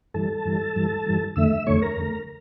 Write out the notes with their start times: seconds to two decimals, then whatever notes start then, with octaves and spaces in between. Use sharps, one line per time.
0.14 G2 E3 G3 A4 A5
0.45 G2 E3 G3
0.76 G2 E3 G3
1.06 G2 E3 G3
1.36 F2 D3 A3 E5 E6
1.67 F2 D3 A3 C#5 C#6
1.82 A#4 A#5
1.97 F2 D3 A3